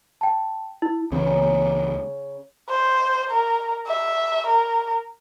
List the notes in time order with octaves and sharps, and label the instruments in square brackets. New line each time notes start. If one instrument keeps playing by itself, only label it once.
[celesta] G5 A5
E4
[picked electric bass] C#2 E3 C4 [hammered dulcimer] C#3 A#5
[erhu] C5
A#4
E5
A#4